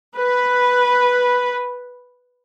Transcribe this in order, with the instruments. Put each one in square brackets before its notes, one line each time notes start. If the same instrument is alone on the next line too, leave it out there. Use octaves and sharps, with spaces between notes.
[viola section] B4